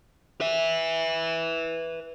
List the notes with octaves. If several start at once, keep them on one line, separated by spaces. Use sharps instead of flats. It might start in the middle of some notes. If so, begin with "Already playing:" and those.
B4 E5